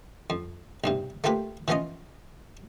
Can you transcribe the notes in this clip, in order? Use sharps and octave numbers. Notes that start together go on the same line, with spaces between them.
F2
B1 G2 C3
A3 A#3 F4 G4 B4
E3 F3 B3 C#4 F4 D#5